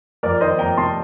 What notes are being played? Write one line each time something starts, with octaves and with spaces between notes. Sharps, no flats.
F2 A#4 D5
D#3 C5 D#5
F2 G5 A#5
C3 A5 C6